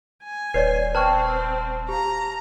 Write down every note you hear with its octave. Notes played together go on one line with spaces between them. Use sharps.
G#5
D#1 B4 C#5 D5 C7
C4 C5 G5 A5 C#6 F6
G4 F5 A#5